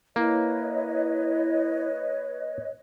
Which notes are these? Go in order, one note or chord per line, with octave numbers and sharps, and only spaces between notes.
A#3 E4 B4 C#5 D#5